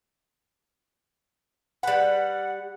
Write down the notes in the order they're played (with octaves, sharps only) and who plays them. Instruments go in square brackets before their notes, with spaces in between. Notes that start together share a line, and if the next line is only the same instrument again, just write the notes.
[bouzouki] G3 B4 [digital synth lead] F#5